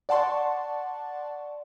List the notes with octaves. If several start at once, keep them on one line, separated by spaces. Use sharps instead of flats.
D5 F#5 A5 C6 C#6